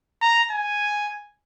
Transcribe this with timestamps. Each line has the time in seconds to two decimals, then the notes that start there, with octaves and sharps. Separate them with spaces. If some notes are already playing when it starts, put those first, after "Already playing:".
0.22 A#5
0.51 G#5